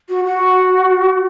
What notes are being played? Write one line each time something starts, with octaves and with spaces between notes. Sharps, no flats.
F#4
F#4